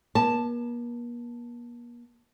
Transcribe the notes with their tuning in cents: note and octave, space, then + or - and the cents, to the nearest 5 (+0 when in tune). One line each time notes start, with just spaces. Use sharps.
A#3 +45 A5 +0